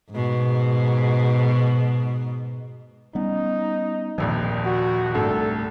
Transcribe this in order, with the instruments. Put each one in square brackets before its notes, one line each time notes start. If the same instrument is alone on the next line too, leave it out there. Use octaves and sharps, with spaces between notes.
[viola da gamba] G#2 B2
[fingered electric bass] G3 B3 C#4 [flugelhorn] D#4
[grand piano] D#1 A#1 F2 [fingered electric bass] D#3 F3
[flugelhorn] F#4
[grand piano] C2 [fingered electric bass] G#2 A3 D4 [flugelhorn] A4